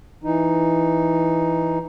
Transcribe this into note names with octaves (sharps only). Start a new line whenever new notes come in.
E3 D#4